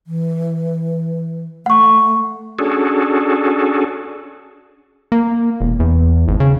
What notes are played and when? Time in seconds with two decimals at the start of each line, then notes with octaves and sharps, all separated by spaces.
0.07 E3
1.66 A3 F#5 C#6
2.59 C#4 D4 F#4 G#4 A4
5.12 A#3
5.61 E1
5.80 E2
6.28 G#1
6.40 C#3